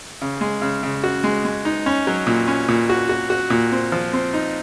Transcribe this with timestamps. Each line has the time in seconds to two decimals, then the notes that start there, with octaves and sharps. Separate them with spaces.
0.22 C#3
0.41 G#3
0.62 C#3
0.83 C#3
1.04 F#4
1.24 G#3
1.45 G#3
1.65 D#4
1.86 C#4
2.07 F#3
2.27 A#2
2.48 C#4
2.68 A#2
2.90 F#4
3.09 F#4
3.30 F#4
3.50 A#2
3.72 C4
3.92 F3
4.13 C4
4.34 D#4